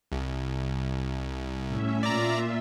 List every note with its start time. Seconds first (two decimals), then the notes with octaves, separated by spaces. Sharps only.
0.12 C2
1.67 A2 C#4 E5
2.03 A#2 F4 D5 E5 A#5